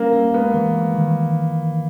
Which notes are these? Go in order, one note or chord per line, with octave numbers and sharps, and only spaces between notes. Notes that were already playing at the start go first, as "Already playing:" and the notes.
Already playing: G3 A#3 C#4
G3
G#3 B3
E3
E3
D#3